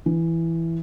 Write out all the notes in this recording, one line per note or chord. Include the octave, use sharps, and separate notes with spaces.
E3